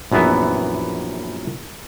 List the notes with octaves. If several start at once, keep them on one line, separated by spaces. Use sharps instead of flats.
A#1 F#2 E3 B3 E5